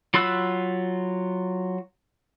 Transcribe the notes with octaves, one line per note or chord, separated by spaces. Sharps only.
F#3 F4 B5 E6 F#6